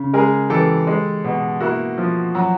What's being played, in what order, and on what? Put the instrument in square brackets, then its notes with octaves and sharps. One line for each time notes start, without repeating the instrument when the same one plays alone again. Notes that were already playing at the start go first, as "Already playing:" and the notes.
Already playing: [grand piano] C#3
G#3 G#4 A#4
E3 G4 A4
G#3
B2
A#3 E4 F#4
F3
F#3